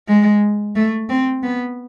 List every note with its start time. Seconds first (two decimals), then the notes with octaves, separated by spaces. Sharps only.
0.08 G#3
0.76 A3
1.09 C4
1.43 B3